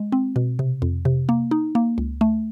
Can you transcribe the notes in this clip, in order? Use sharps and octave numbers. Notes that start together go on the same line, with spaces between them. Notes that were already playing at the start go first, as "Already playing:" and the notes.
Already playing: G#3
C4
B2
C3
F2
C3
A#3
D#4
A#3
C#2
A3